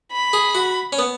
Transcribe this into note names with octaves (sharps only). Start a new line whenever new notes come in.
B5
G#4
F#4
C#4
B3